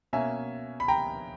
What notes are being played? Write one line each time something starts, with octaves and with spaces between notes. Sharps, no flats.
B2 A#3 C#4 E5 G#5
B5
G5 A#5